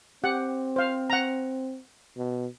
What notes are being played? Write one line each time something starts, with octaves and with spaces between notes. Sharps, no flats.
C4 G4 F#5
C5 F5
F#5 A#5
B2